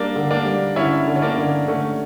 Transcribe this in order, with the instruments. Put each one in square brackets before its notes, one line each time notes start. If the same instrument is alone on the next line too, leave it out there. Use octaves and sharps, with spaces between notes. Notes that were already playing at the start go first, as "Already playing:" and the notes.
Already playing: [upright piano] G3 [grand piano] A#3 D4
[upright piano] D3
[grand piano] A#3 D4
[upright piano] G3
[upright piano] D3 [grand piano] C#4 E4
[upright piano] D3
[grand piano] C#4
A#3 D4
[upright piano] D3
[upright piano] D3 [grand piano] A3 C#4